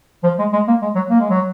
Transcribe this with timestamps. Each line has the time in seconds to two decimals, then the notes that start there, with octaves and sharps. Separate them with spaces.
0.23 F3
0.39 G#3
0.53 G#3
0.68 A#3
0.82 G#3
0.95 F#3
1.10 A#3
1.20 G#3
1.30 F#3